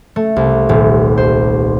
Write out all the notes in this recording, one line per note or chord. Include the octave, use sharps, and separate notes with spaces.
A3
C2
D#1
C5